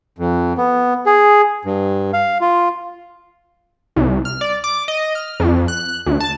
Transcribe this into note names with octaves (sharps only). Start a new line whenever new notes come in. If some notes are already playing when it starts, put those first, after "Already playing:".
F2
B3
G#4
G2
F5
F4
C2
F6
D5
D6
D#5
F6
F2
F#6
D2
A5